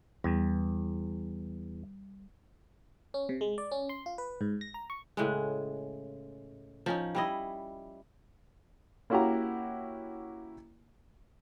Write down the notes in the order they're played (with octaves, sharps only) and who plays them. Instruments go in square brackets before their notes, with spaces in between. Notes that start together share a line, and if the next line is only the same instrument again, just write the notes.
[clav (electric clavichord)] E2 [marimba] G3
[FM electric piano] C#4
C3
G#3
D5
C#4
C6
F4
B4
G#2
A#6
A#5
C#6
[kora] A2 C#3 G#3
F3 C#4 D#4
G3 E4 D#5
[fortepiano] A#3 C#4 E4 F#4 G4 A#5